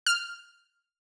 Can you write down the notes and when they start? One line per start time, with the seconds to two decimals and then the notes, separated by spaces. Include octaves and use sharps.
0.06 F6